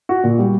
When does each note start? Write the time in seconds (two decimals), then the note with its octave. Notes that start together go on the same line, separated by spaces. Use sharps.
0.09 F#4
0.24 A#2
0.39 G3